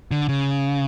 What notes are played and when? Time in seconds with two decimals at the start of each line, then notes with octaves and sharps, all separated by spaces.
0.11 D3
0.29 C#3